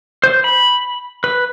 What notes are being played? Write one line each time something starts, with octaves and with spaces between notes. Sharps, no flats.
C5
B5
B4